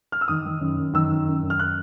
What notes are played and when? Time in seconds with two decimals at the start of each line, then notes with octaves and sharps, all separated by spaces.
0.12 F6
0.21 E6
0.28 D#3 D#6
0.45 D#3
0.61 F#2
0.78 F#2
0.94 D#3 E6
1.11 F#2
1.27 F#2
1.43 F#2
1.50 F6
1.59 F#6